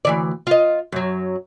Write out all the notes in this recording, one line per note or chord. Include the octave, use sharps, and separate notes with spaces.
D2 E3 D5
F4 D#5
F#2 F#3